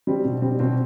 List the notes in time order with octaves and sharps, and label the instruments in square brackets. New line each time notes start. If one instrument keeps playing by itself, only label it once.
[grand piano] G3 C4
B2
G3 C4
B2 C4